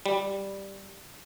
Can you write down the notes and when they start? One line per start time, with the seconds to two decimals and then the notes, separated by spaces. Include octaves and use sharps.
0.06 G3